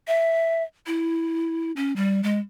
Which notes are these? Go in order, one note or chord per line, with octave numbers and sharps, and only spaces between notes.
E5
E4
C#4
G3
G#3